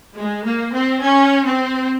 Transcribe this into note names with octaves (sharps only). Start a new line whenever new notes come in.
G#3
A#3
C4
C#4
C4